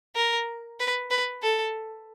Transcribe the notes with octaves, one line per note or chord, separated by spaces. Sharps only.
A#4
B4
B4
A4